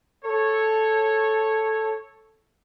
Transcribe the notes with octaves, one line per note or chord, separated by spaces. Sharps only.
A4 C#5